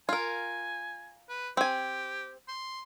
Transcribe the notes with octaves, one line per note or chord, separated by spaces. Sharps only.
F4 A#4 G#5
B4
C4 G4 G#5
C6